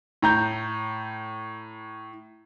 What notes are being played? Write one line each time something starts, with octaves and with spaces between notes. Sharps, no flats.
A2 A#5 G6